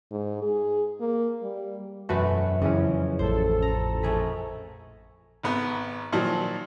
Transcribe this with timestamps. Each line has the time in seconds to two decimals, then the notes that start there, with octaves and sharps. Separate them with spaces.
0.11 G#2
0.42 G#4
1.01 A#3
1.43 G3
2.09 E1 F#2 A3 F#4 B4
2.62 F2 C#3 E3 C#4
3.19 A1 A4 C5
3.62 A#5
4.02 A#1 G#4 B6
5.43 G#1 B3 B4
6.12 A#2 D#3 F3 F#3